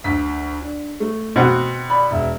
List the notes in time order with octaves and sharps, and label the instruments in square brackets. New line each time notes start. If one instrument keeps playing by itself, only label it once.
[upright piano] D2 B6
D4
A3
[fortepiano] B2 C4 F#5
[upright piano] D5 B5
E1 E5